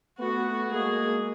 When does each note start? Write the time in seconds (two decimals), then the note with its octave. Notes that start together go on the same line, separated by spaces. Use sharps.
0.19 A3 B3 F#4
0.70 G#3 A#3 G#4